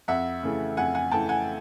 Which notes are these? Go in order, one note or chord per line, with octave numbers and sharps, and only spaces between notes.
F2 E5 F#5
C#3 E3 A3
F2 F#5 G#5
F#5 G#5
C#3 E3 A3 G5 A5
F#5 G#5